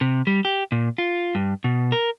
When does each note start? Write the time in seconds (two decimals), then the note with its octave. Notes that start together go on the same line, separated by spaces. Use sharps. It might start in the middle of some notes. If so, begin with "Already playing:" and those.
0.01 C3
0.27 G3
0.45 G4
0.72 A#2
0.98 F4
1.35 G2
1.64 B2
1.92 A#4